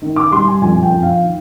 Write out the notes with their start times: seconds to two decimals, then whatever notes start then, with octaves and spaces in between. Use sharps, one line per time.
0.02 D#3
0.16 D6
0.31 G3 C6
0.48 G#5
0.62 F2 G#5
0.83 G5
0.92 F2
1.03 F5
1.23 D#3